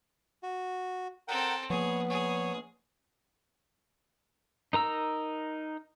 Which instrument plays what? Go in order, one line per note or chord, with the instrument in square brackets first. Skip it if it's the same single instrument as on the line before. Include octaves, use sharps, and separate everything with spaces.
[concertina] F#4
[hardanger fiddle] C4 A4 [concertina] A#4 F#5 G5
[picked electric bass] F3 A#3 [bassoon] B3 [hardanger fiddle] G#4 [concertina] C#5
[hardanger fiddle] G#4 [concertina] C#5
[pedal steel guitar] D#4 A#4 A#5 E6